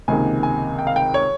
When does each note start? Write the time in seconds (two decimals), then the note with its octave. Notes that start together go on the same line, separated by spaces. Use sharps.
0.08 C#2 C3 D#3 A#3 D#4 G#5
0.43 G#5
0.79 G5
0.87 F5
0.96 G5
1.14 C#5